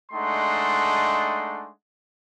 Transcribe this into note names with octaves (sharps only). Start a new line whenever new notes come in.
G#3 A3 D4 D#4 F#5 C6